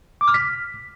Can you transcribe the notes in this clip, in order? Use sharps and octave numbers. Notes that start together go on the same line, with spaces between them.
D6
F6
B6